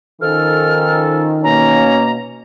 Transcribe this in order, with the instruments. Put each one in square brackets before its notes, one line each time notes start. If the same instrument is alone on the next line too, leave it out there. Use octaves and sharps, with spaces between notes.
[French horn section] D#3 [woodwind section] F3 C#4 A4 [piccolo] F6
[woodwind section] B2 A#3 [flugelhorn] C#4 [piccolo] A#5